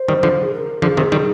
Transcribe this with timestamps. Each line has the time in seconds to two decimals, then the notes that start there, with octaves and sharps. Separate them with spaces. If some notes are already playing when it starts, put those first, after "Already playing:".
Already playing: C5
0.08 D#3 G3
0.23 D3 F3
0.42 G#4
0.53 A#4
0.82 D3 F3 G#4
0.97 C3 D#3
1.12 D#3 G3